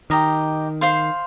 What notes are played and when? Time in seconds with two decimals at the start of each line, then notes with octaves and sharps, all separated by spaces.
0.10 D#3 G4 D#5 A#5
0.81 C5 F5 C6